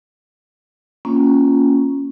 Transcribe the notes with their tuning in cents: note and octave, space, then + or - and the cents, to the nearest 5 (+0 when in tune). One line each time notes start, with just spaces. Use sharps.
A#3 +0 C#4 +0 F4 +0